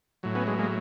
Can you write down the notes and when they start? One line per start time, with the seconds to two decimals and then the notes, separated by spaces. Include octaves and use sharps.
0.23 A2 F#3
0.35 B3 C#4
0.47 G#3
0.58 G#3 A#3